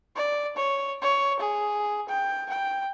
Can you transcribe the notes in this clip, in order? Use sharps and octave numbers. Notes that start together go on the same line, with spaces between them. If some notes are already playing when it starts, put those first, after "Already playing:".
D5
C#5
C#5
G#4
G5
G5